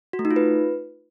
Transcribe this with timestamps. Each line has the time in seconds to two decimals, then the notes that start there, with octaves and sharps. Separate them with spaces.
0.13 F#4
0.19 A3
0.25 D#4
0.31 F4
0.36 B4